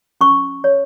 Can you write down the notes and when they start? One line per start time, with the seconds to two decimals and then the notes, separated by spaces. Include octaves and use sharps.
0.21 C#4 C#6
0.64 C#5